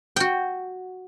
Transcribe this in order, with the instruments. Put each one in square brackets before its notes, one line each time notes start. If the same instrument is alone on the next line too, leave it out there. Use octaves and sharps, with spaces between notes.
[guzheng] F#4 G5